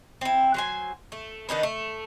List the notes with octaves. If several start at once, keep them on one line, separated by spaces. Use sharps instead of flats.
C4 E4
F#3 C5 G#5
A3
D#3 D4 D#4 B4
A3